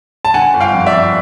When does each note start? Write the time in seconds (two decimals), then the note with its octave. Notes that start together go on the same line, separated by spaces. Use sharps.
0.25 A5
0.34 D3 F#5 G#5
0.54 G1
0.61 F5 G5
0.74 F2
0.86 D5 E5
0.94 G1